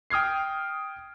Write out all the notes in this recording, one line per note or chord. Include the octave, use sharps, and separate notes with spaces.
G5 D#6 F6 G#6 C7